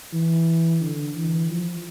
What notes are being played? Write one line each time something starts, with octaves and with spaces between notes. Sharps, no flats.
E3
D3
E3
F3